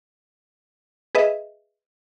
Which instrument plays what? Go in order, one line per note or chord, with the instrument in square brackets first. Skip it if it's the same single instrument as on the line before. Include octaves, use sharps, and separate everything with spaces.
[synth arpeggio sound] G#4 B4 D#5 E5